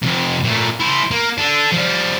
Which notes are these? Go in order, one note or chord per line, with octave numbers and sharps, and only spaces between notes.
F2 C3
A#2 A3
E4 C5
A#3
D4 A4
F3 G3